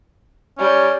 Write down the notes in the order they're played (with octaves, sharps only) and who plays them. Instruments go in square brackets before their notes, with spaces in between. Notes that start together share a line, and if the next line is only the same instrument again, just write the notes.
[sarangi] G3 [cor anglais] C#4